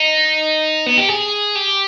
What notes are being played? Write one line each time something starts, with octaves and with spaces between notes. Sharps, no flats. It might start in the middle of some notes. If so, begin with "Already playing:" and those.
Already playing: D#4
B3
G4
G#4
G4